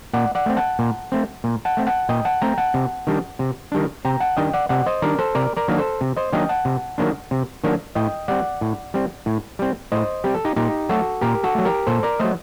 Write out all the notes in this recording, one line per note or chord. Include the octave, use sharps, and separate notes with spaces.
A#2 D5 F#5
D5 F#5
A3 C4
F#5 A5
A#2
A3 C4
A#2
F#5 A5
A3 C4
F#5 A5
A#2 D#5 G5
F#5 A5
A3 C4 G5 A#5
F#5 A5
C3
D#3 G3 D4
C3
D#3 G3 D4
C3 G5 A#5
F#5 A5
D#3 G3 D4 D#5 G5
D5 F#5
C3 D5 F#5
C5 D#5
D#3 G3 D4 A#4 D5
A4 C5
C3 A#4 D5
A#4 D5
D#3 F#3 A#3 D4
A4 C5
C3
C5 D#5
D#3 F#3 A#3 D4 D#5 G5
F#5 A5
C3
D#3 F#3 A#3 D4
C3
D#3 F#3 A#3 D4
A2 D#5 G5
G3 C4 D5 F#5
A2
G3 C4
A2
G3 C4
A2 C5 D#5
G3 C4 G4
A4
D#4 G4
A#2 D#4 G4
F#3 A3 F#4 A4
A#2 G4 A#4
F#4 A4
F#3 A3
G4 A#4
A#2 A4 C5
A#4 D5
F#3 A3 C5 D#5